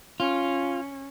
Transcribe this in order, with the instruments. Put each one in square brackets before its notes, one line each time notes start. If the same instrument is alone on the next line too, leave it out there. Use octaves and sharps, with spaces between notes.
[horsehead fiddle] C#4 [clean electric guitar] F4